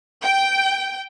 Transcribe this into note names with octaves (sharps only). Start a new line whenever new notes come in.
G5